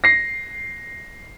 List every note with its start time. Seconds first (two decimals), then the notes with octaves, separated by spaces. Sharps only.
0.04 A#6 C7